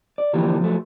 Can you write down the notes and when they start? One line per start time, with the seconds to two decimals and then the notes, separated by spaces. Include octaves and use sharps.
0.18 D5
0.33 D3 E3 F3 G3 A#3 G4
0.60 F3 F#3 A3